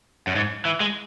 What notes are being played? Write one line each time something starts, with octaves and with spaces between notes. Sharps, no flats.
F#2
G#2
E3
G#3